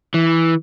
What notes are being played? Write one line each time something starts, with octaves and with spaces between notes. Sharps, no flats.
E3